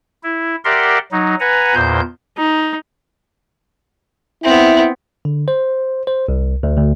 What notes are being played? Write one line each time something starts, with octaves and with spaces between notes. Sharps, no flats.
E4
G4 A#4 D5 E5 F#5 C6
F#3 D#4
B4 F#5 G#5 A#5
E2 A#2 C5 G6
D#4
B3 C4 E4
D3
C5
C5
C2
D2
D2